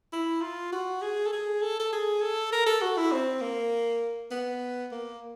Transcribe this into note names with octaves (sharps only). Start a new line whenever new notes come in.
E4
F4
F#4
G#4
A4
G#4
A4
A4
G#4
A4
A#4
A4
F#4
E4
C4
A#3
B3
A#3